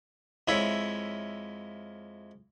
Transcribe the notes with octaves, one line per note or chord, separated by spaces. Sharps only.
F2 G#3 E4 C#5 E5